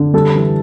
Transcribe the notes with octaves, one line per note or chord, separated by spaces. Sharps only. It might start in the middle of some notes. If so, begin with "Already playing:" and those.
Already playing: D3
G3 A4
E3